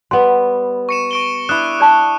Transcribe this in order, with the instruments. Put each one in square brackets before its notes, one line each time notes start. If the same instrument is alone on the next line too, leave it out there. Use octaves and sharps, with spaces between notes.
[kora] G3 B3 [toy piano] C6
[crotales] C#6 C#7 E7
C#6 D7 G7
[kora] D4 E4 [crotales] D#6 F#6 E7
[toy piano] D5 A5 C#6